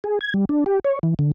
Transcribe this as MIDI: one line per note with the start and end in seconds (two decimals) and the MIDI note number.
0.04 0.19 68
0.21 0.33 92
0.34 0.45 55
0.49 0.64 62
0.66 0.79 67
0.84 0.99 73
1.03 1.14 52
1.19 1.32 50